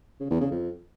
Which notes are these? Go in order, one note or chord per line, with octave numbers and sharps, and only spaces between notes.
C#3
E2
C#3
F2